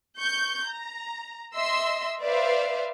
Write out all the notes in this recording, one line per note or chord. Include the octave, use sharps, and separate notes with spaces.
C#6 G6
A#5
D#5 E5 C6 E6
B4 C5 D5 E5 F5